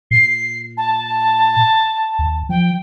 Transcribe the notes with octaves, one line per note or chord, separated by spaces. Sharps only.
A#2 C7
A5
D#2
F3 G5